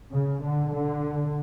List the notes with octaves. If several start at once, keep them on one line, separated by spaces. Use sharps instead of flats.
C#3
D3
D3